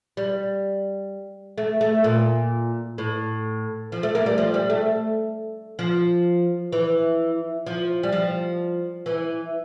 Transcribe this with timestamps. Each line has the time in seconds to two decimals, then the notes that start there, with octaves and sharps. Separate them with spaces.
0.17 G3
1.58 A3
1.81 A3
2.04 A#2
2.98 A2
3.92 F3
4.03 A3
4.15 A#3
4.26 G3
4.38 F3
4.54 G3
4.70 A3
5.79 F3
6.72 E3
7.66 F3
8.03 G3
8.12 F3
9.06 E3